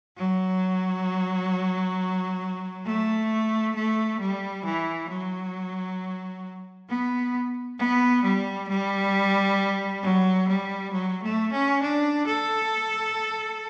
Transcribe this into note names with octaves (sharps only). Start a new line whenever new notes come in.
F#3
A3
A3
G3
E3
F#3
B3
B3
G3
G3
F#3
G3
F#3
A3
C#4
D4
A4